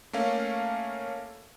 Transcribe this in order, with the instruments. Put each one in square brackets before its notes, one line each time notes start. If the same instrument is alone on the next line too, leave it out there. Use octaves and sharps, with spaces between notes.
[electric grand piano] A3 A#3 C#4 F5